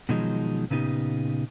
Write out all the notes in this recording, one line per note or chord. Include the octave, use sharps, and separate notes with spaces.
B2 D#3 F3 F#3 G#3 D#4
A#2 C#3 B3 D#4 G4